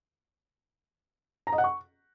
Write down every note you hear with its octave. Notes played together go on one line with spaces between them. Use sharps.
A#5
D#5
F#5
C#6